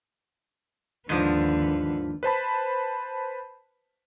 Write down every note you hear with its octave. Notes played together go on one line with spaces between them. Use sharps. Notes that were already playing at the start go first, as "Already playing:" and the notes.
D#2 G#2 D3 F3 B4
B4 C5 A5 B5